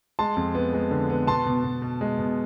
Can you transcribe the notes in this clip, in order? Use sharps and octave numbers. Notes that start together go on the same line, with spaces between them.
G#3 A5 C6
F2
B3
G#3
D3
B3
B2 A5 C6
B2
B2
B2
G#3
B2